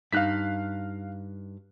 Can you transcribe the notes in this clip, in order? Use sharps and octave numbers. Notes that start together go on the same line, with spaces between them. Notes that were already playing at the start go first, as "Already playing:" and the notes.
G2 D#4 F5 F#6 B6